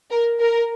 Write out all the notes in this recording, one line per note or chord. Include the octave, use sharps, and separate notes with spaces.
A#4
A#4